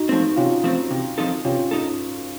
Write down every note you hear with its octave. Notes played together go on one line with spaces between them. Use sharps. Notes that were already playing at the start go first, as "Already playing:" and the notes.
Already playing: D#4 F#4
F3 A3 C4
C3 C#4 F4
F3 A3 C4
C3
F3 C4 D#4 A4
C3 C#4 F4
D#4 A4